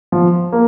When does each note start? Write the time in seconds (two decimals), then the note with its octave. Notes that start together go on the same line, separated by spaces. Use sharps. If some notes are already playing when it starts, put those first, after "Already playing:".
0.12 F3
0.52 A#3